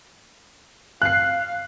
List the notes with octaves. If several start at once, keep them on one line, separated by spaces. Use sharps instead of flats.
F5 F#6 C7